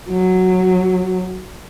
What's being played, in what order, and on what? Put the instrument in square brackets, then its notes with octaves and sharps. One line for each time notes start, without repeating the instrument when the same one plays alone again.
[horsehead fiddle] F#3